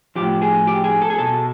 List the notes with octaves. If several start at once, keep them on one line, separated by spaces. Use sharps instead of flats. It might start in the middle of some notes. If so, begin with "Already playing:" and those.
A2 F3 G4
G#4
G4
G#4
A4
G#4
B2 A4